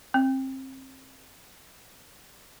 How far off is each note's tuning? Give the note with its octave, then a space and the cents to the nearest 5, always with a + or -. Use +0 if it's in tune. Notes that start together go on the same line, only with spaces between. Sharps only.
C4 +25